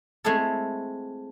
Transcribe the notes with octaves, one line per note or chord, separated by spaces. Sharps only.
G#3 A3 C4 E4 G#4 A4